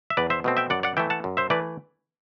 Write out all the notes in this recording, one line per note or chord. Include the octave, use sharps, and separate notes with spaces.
E5
E2 B4 D5
C5 E5
B2 A3 C4
E5 G5
F#2 D5 F#5
D5 F#5
E3 A3 E5 G5
F#5 A5
F#2
C5 E5
E3 A3 B4 D5